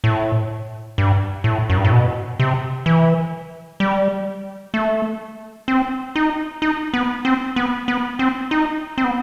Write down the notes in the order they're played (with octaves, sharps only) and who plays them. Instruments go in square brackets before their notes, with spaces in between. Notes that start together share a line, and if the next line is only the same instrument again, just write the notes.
[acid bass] A2
G2
A2
F#2
G2
A2
B2
C3
E3
G3
A3
C4
D#4
D#4
B3
C4
B3
B3
C4
D#4
C4
B3